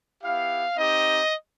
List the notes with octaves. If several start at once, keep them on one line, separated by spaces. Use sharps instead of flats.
B3 E4 G4 F5
C4 D#4 G4 D#5